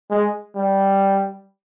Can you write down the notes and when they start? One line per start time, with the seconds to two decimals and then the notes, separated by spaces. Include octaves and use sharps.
0.11 G#3
0.56 G3